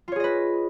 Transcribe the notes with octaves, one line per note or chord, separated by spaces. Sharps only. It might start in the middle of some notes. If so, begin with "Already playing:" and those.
F4 G#4 B4 C#5 D#5